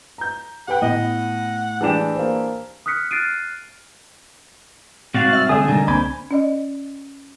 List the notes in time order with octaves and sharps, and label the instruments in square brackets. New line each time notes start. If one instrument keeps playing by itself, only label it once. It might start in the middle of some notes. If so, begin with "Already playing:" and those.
[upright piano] A#5 G6
[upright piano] G4 B4 G5 [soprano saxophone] F#5
[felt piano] A2 [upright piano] B3 [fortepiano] D#5
[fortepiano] E3 D4 G4 [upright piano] G#4 A5 E7
[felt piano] A#3 C5
[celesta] D#6 F6 F#6 B6 C#7
F6 F#6 A6 C7 D7 D#7
[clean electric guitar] C2 G#2 C3 [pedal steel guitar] F#4 D5 [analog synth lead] F5
[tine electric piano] E5 E6 [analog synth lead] F6
[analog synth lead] D3 [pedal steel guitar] A3 G#4 D#6 [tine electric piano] G#5
[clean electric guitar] C3 G3 [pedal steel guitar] D#3 D#4
[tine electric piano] C2 A#3 C4 [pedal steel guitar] C5 G#5 D6 [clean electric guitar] B5
[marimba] C#4 D5 D#5